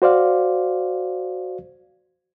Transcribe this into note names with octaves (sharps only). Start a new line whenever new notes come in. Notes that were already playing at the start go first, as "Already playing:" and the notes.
F#4 C5 D5 F5